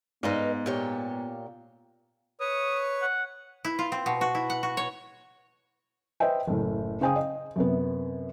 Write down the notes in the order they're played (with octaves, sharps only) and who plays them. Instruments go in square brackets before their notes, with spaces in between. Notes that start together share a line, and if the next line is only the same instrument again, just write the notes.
[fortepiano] G#2 [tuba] B3 [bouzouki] B4 D#5 F5
[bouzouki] A#2 G4 C#5
[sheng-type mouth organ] B4 C#5 C#6 [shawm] D#6
[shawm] F#5
[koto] E4
F4
C4
B2
F#4
E4
F#5
F#4
C#5
[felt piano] B4 C5 D#5 E5 G5
F#1 A2
C#3 C5 G5 G#5 D#6
D#5
F#2 C3 B3